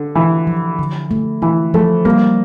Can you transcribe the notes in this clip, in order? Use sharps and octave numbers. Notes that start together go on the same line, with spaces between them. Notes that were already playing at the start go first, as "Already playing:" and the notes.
Already playing: D3
E3 E4
F3
D3
A3
E3 E4
F3 A3
G3 A#3